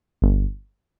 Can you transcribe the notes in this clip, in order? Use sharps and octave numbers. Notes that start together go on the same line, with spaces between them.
G1